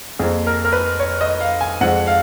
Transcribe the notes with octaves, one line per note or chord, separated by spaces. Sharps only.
F2 F3 A#3 G#4
A#4
A#4
B4
C#5
D#5
F5
G#5
F2 F3 G#3 F#5
F5